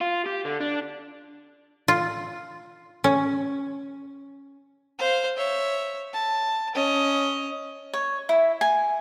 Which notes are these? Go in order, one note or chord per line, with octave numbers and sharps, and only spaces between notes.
F4
G4
D3
D4
F4
C#4
C5 F5
C#5 E5
A5
C#4 D#5
C#5
E4
G#5